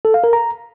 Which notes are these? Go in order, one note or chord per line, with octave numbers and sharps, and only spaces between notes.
A4
F5
A#4
A#5